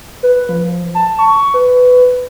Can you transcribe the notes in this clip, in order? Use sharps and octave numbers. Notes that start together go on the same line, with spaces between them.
B4
F3
A5
C#6
B4